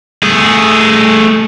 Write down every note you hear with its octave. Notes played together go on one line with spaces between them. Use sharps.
A3 G#4